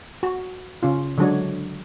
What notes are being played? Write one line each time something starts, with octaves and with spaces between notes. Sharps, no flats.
F#4
C#3 C#4 F4
D3 F#3 G#3 D4 F#4 C#5